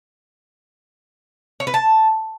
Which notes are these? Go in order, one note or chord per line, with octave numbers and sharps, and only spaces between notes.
C#5
B4
A5